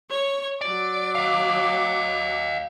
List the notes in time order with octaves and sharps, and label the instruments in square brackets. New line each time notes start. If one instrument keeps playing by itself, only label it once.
[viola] C#5 C#6
[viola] F#3 D6 [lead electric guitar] D5
[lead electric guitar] D#5 F5